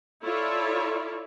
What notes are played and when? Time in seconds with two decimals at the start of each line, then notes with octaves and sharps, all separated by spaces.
0.23 E4 F4 A4 C#5 D5 E5